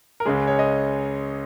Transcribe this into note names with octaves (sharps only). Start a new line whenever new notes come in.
A#4
C#2 C#3 G#3 C#4 G#4
C#5
D#5